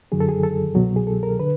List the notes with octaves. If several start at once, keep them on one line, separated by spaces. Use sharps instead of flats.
F#2 D3 F#3 G#4
A4
G#4
A4
C2 B2 F#3
G#4
A4
A#4
D3 B4